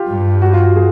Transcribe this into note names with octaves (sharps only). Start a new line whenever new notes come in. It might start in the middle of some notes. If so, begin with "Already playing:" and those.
Already playing: F4 G4
G2
F#4
F4
F#4
G#4